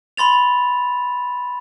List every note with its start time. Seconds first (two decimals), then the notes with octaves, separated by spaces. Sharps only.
0.17 B5 C6 A6 F7